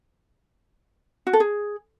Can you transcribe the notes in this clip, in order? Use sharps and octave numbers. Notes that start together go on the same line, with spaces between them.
F#4
A4
G#4